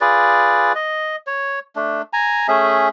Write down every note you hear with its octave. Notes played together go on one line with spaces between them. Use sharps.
F4 G#4 B4 D5
D#5
C#5
A3 D4
G#5 A#5
A3 C#4 G#4 E5